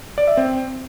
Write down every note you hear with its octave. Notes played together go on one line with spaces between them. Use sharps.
D5
E5
C4